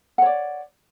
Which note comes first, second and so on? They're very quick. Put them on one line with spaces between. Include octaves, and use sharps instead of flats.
F#5 C#5 D5